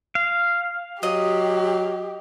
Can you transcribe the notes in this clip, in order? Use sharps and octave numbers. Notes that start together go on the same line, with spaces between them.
F5
F#3 G4 D#5